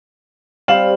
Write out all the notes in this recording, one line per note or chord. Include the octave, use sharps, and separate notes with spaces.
G3 C4 F5 E7 F#7